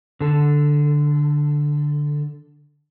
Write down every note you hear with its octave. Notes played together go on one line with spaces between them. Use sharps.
D3 A4